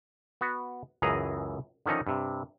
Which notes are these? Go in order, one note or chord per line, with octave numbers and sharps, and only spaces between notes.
B3 F#4
C#2 F#2 E3 G#4 D#5 A#5
D3 D#3 F3 C#4 D#4
G2 C3